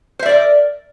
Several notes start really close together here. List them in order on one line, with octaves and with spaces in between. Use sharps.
C5 E5 D5 A#4